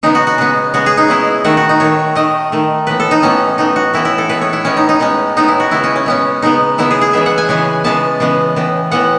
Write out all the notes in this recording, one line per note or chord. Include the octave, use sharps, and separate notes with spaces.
C#3 G#3 B3 D#4
F#4
F#4
C#3 G#3 B3
C#3 G#3 B3 F#4
G#4
D#4
C#3 G#3 B3 E4
D#3 A3 F#4
F#4
D#4
D#3 A3 C#5
D#3 A3 D#5
D#3 A3
A2 E3 B3 B4
A4
D#4
A2 E3 B3 C#4
A2 E3 B3 D#4
F#4
A2 E3 B3 E4
E4
A4
A2 G#3 B3 B4
C#5
E4
A2 G#3 B3 C#4
D#4
D#4
A2 G#3 B3 C#4
A2 G#3 B3 D#4
E4
F#4
C#3 G#3 B3 E4
C#4
C#4
C#3 G#3 B3 C#4
C#3 G#3 B3 D#4
C#3 G#3 B3 E4
G#4
G#4
C#3 E3 G#3 B3 E5
F#5
G#5
C#3 E3 G#3 B3 G#5
C#3 E3 G#3 B3 A5
C#3 E3 G#3 B3
A2 E3 B3
A2 E3 B3 F#5